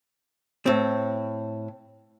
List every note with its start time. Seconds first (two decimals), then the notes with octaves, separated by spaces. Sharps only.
0.66 A2 C4